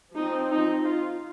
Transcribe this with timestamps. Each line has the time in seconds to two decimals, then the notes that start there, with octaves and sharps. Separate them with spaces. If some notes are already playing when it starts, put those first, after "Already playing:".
0.15 F3 C4 D#4
0.51 D#4
0.85 F4